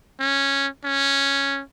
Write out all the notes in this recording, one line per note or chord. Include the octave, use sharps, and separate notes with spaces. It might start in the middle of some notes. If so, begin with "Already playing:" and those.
C#4
C#4